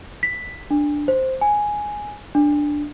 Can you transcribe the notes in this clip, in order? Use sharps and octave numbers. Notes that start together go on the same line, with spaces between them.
B6
D4
C5
G#5
D4